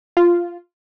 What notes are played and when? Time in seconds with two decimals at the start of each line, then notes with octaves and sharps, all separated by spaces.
0.17 F4